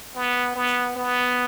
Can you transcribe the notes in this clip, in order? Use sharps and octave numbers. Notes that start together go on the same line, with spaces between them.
B3
B3
B3